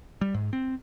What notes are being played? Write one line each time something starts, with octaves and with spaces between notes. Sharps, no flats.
G3
G#2
C4